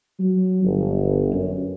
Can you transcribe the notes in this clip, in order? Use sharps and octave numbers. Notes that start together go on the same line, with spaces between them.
F#3
G1
F#2